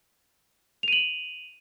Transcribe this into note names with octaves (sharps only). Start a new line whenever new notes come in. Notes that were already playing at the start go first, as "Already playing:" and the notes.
D#7 F7 F#7